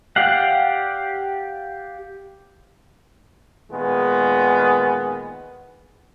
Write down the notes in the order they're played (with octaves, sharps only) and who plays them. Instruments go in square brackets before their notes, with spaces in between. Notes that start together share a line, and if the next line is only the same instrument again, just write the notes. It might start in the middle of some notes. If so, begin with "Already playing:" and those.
[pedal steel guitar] G4 D5 F5 F#5
[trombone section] A#2 D#3 G#3 B3